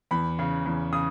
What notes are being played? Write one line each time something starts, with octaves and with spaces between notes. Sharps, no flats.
E2 B5
C#3
E2
C#3 D#6